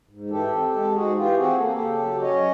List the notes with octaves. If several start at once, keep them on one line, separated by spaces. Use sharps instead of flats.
G#2
E3 G4 A4
C4
G#3
G#2 F#4 G#4
E3 F4 G4
C4 F#4 G#4
A#3 A4
G#4
G4 A4
C#3
F#3
C#4 C#5 D#5